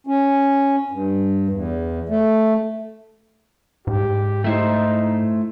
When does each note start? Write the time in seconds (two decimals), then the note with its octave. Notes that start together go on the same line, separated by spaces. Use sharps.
0.07 C#4
0.91 G2
1.50 E2
2.09 A3
3.87 G#2 G4
4.44 A3 D#4 E4 C5